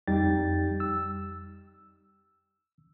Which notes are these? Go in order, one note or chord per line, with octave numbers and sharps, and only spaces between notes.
F2 G3 D#4 G4 G5 A6
E6